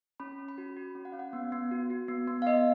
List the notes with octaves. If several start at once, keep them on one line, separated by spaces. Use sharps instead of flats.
C#4 B5
C#4
B5
F#4
F#4
C#4
F#5
C#4 F5
F#5
B3
B3
F#4
F#4
B3
B3
F5
B3 D#5